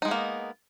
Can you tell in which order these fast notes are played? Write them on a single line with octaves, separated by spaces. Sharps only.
D#4 G#3 B3 A#3